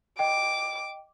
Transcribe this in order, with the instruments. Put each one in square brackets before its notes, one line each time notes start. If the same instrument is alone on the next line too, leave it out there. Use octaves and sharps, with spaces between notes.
[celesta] D#5 G5 [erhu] D6